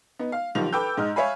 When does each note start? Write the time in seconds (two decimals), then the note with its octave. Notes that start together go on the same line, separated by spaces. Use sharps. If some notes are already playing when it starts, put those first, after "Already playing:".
0.19 B3 D#4
0.32 F5
0.55 B1 D#3 F3 G3 F7
0.73 A4 B4 G5 D6 E6 G6
0.97 G#2 D#5 F6
1.16 C#5 E5 F5 G#5 B5